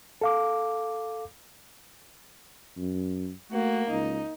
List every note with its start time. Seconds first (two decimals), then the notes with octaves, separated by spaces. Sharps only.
0.21 A4 F5 D6
2.78 F#2
3.51 A3 A#3 F#4
3.90 C#2 D#4